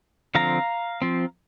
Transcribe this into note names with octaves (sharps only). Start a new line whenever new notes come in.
D3 F3 C4 F5 A#5
F3 C4